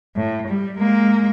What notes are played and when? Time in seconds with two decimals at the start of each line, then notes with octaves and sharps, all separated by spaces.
0.16 A2
0.48 G3
0.78 G#3 A#3